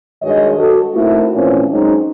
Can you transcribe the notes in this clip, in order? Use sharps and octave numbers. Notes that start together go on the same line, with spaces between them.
G2 D#3 G#3 F#4 C#5 D#5
F#4 A4
A3 A#3 C4 D#4 E4 F#4
A#2 E3 F3 A3 C4 C#4
F#3 G#3 C4 C#4 D#4